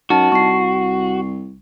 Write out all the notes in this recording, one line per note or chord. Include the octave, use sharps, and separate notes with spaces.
F#2 D#4 F#4 A5
C2 C#6 C7